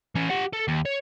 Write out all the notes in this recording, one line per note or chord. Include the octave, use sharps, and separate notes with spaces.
E3 C#4
G4 F#5
A4
D#2
C#5